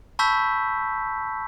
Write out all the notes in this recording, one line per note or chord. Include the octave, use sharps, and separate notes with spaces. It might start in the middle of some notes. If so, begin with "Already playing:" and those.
A5 B5 C#6 E6 G6 B6